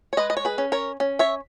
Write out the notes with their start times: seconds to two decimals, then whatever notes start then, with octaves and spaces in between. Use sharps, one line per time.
0.13 C#5
0.17 G#3 B4 D#5
0.30 D#5
0.37 C#5
0.45 G#4 B4
0.58 C#4
0.72 A#4 C#5
1.00 C#4
1.19 C#5 E5